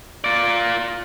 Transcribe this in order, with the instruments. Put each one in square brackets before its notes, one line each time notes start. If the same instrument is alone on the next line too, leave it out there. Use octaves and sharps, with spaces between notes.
[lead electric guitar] F4 D5